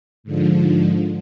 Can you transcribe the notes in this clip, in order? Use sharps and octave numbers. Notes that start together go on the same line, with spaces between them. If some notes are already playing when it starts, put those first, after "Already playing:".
G#2 D3 F3